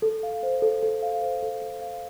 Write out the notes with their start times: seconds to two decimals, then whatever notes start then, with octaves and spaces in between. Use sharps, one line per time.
0.02 A4
0.23 F5
0.43 C5
0.62 A4
0.83 A4
1.03 F5
1.22 C5
1.43 A4
1.62 A4
1.82 F5